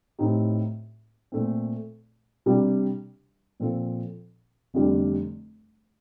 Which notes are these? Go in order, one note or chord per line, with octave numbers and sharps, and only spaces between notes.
A2 A3 C4 D#4 G4
A#2 A3 C4
C3 G3 D4 G4
A#2 F3 C4 F4 A4
F1 F2 D3 G3 D4